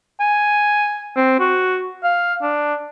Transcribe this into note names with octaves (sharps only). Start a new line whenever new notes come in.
G#5
C4
F#4
F5
D4